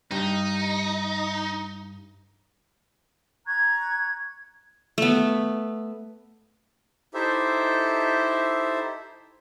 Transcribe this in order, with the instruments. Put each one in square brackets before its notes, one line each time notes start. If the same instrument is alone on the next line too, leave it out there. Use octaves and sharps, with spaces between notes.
[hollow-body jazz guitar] G2 [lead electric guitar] D#4
[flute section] A#5 C#6 F#6 G#6
[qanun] A3 B3
[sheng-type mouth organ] D#4 E4 G4 A4 C5 E5